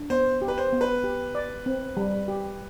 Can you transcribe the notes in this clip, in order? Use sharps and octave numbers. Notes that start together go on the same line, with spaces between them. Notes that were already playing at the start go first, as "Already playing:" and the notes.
Already playing: D4
B3 C5
G4
B4
C5
B3
B4
G4
D5
C4
G3
G4